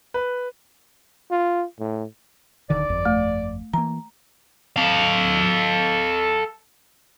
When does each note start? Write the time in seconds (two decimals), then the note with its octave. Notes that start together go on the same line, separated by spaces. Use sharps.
0.14 B4
1.31 F4
1.79 A2
2.70 D1 D3 D#3 D5
2.89 G1 F2
3.05 A3
3.74 E3 A#3 A#5
4.76 A4 F5